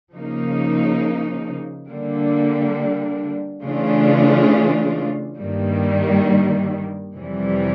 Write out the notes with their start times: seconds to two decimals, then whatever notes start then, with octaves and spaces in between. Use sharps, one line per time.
0.13 C#3 F3 A#3 D#4
1.87 D3 G3 A#3 D4
3.63 C#3 E3 A3 D4 F4
5.38 G2 D#3 G3 A#3
7.14 F2 C3 E3 G3